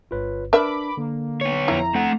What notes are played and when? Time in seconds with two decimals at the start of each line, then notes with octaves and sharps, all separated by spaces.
0.11 G1 F4 B4 C#5
0.53 D4 A#4 B4 E5 B5 D6
0.97 D3 A#3
1.41 B3 C#5
1.68 F2 E4 A#5
1.95 A3 C4 A4 F#5